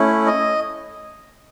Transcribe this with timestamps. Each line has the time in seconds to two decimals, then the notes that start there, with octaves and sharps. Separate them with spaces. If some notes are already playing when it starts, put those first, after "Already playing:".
Already playing: A3 C#4 E4
0.26 D#5